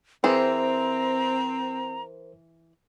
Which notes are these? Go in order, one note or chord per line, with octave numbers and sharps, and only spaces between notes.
E3 C4 G#4 A#4 C5 A#5